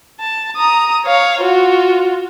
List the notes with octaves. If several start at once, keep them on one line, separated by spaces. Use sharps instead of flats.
A5
A#5 D#6
C#5 F5
F4 F#4